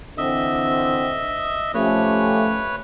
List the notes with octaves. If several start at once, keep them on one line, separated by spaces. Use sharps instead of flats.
D3 E3 C4 D#5 E5
F3 A3 C#4 G4 B4 C#5